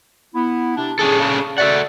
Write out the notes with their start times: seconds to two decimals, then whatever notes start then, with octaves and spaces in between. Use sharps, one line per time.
0.34 B3 E4
0.77 C3 D4
0.99 C#4 D4 G#4 A4
1.20 C#3
1.58 F#4 A4 D5 E5 F#5